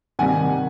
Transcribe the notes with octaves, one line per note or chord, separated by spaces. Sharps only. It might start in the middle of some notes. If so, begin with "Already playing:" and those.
C3 D#3 G3 F#5 G#5